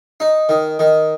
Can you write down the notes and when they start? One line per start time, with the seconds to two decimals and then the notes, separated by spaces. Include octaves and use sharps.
0.20 D#4
0.49 D#3
0.79 D#3